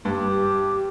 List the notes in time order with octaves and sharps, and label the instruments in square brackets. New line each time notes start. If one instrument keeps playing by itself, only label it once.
[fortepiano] G2 [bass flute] G4